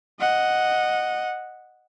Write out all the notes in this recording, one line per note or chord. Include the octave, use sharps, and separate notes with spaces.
D#5 F#5